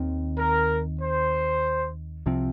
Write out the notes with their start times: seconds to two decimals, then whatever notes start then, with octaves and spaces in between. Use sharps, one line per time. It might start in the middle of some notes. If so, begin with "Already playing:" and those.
Already playing: D#2 D#3 C4
0.39 A#4
1.02 C5
2.26 C2 C3 F3 C4